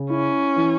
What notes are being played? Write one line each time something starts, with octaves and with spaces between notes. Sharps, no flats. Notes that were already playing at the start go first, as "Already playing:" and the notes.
Already playing: C#3
C#4 E4
E3